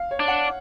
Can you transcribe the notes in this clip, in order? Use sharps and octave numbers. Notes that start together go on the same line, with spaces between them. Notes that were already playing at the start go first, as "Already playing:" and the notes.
Already playing: F5
C#5
D4
F#5